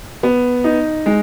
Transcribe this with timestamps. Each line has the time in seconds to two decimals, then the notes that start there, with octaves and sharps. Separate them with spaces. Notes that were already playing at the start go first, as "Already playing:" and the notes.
0.23 B3
0.64 D#4
1.06 G#3